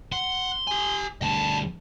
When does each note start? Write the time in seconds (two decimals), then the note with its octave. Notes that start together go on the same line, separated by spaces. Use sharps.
0.12 F#5 C6
0.67 G4 G#5
1.22 D2 G3 G5 A5